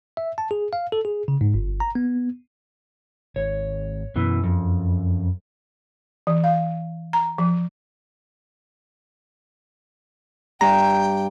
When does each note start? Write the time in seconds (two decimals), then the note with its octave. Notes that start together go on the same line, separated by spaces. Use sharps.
0.17 E5
0.38 A5
0.51 G#4
0.73 F5
0.92 A4
1.05 G#4
1.28 C#3
1.41 G#2
1.54 G1
1.80 A#5
1.95 B3
3.36 G#1 C#5
4.16 F#2 B2 E3
4.44 F2
6.27 E3
6.44 F5
7.13 A#5
7.38 F3
10.61 G2 G5 A#5